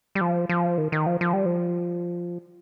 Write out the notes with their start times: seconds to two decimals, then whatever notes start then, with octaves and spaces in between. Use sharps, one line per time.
0.15 G3
0.21 F3
0.49 F3
0.78 D#3
0.92 D#3
1.06 F3
1.21 F3
1.33 G3
1.46 F3